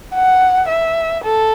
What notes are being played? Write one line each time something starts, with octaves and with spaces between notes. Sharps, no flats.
F#5
E5
A4